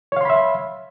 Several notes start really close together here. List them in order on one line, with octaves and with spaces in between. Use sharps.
C#5 F5 C6 B5 E5